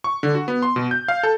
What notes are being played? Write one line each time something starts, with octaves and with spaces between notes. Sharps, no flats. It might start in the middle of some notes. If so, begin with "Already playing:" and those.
C#6
D3
F#4
B3
C6
B2
G6
F5
A4